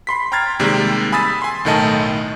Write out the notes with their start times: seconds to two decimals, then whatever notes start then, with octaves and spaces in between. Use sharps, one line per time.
0.07 B5 C6 B6
0.32 G5 A#5 C6 F6 G#6 A6
0.59 C3 D#3 G3 G#3 A#3
1.12 G#5 B5 D#6 E6 A6 B6
1.42 G#5 C6
1.65 B1 A2 D#3 A3 D#5 A5